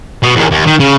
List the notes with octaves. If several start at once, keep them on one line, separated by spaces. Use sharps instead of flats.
B2
E2 D#3
D#2
D#3
C#3